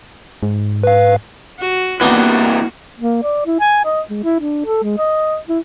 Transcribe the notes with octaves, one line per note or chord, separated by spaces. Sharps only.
G#2
B4 F5
F#4
C3 E3 A#3 B3 D4 D#4 F#4
A#3
D5
E4
G#5
D#5
G#3
E4
D4
A4
G#3
D#5
E4